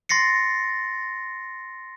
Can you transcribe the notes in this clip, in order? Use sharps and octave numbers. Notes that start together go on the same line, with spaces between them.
C6 A6 A#6 C7 C#7